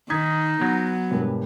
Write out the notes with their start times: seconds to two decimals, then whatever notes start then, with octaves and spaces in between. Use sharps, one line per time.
0.10 D#3 D#4 D#6 G#6 B6
0.62 F#3 B3
1.11 E1 G2